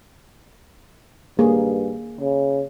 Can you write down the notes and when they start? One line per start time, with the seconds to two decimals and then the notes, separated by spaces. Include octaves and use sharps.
1.39 G2 A#3 G#4
2.21 C#3